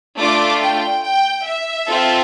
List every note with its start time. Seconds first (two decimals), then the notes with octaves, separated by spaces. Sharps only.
0.18 A3 D4 F4 D6
0.61 G5
1.04 G5
1.46 E5
1.89 C4 F4 A4